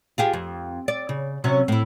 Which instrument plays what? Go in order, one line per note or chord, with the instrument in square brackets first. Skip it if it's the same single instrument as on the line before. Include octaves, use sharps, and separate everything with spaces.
[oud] F4 G4 G#4
F2
D5
C#3
C3 F#3 C#4
A2 E4